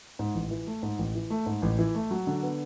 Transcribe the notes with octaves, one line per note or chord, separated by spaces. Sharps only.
G#2
A1
E3
A3
G#2
A1
E3
A3
G#2
A1
E3
A3
F#3
D3
B3